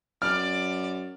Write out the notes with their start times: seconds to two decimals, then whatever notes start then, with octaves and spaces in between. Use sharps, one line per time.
0.22 F#2 D5 D6 F6